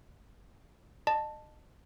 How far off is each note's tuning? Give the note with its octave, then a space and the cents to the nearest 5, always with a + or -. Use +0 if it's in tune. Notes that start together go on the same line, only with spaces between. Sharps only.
D#5 -30 A5 +0